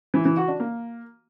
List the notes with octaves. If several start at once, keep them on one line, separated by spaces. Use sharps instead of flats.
E3
E3
F#4
D4
A#3